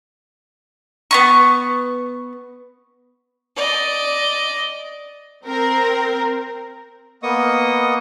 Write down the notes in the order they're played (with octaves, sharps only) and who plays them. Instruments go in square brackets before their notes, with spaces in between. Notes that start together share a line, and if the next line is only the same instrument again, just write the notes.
[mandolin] B3 C#4 C#6
[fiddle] D5 D#5
[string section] C4 A#4
[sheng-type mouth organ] A#3 B3 D#5 C#6 D#6